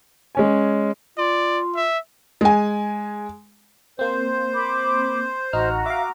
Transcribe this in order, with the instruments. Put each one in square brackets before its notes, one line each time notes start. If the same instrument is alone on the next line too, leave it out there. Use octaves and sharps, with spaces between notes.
[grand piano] G#3 C#4 G#5
[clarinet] F4 [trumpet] D5
[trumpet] E5
[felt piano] G#3 G#5
[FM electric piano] A#3 C4 [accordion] C5
[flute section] B5 D6
[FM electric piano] A1 D#4 F6 [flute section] F#4 A#5
[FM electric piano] E5 F5 [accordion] D6